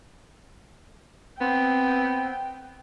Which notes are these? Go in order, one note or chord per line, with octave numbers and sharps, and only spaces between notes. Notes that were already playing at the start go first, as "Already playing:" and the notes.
B3 C4 G5